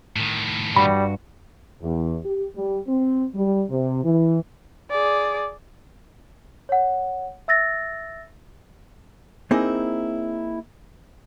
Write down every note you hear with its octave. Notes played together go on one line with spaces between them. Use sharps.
A2 D#3
G2 G3 F#4 B5
E2
G4
G3
C4
G3
C3
E3
G#4 D5
C#5 F#5
E5 E6 A6 A#6
A#3 C4 D#4 E4 G#4